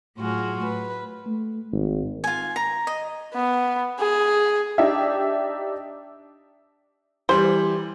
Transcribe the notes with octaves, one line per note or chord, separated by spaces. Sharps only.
A2 F#3 F4 F#4 G#4
B4
A3
G#1
F4 G#5
A#5
D#5
B3
G#4
D4 D#4 G4 E5
E3 G3 C5